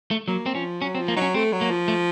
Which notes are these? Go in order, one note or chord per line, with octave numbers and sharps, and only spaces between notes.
A3
F#3 A#3
C4
F3 C#4
F#3 C#4
C4
F3
A#3
F#3 D#4
C#4
A3 C4
F#3
A#3
F3
A3